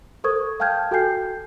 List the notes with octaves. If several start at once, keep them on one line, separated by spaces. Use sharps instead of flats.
A4 A#4 C5 C#6 D#6 G#6
F5 G5 A5 F6 G6 G#6
F#4 A4 G5 G#5 G6 C7